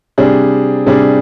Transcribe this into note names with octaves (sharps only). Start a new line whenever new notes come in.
C3 G3 D4 G#4
C3 G3 D4 G#4